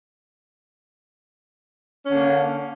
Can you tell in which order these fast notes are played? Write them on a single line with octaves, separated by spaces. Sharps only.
C#4 D3 A#3